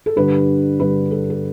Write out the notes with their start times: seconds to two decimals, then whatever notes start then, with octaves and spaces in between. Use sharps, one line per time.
0.06 A4
0.16 G2 D3 G3 D4 B4
0.79 G2 D3 G3 D4 B4
1.11 A4
1.30 A4